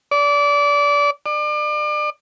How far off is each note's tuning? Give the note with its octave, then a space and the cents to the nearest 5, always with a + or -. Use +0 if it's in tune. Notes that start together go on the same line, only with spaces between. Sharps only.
D5 -25
D5 +35